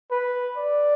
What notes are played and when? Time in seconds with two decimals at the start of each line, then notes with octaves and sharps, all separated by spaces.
0.11 B4
0.57 D5